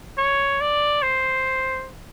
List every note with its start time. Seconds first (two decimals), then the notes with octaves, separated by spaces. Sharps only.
0.18 C#5
0.61 D5
1.02 C5